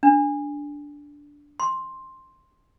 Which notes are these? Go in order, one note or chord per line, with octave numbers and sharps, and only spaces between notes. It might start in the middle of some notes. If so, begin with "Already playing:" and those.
D4
C6